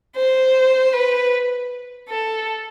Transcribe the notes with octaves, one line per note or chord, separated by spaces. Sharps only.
C5
B4
A4